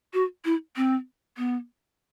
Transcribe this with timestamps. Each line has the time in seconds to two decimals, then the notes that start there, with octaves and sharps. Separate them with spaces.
0.14 F#4
0.45 E4
0.76 C4
1.37 B3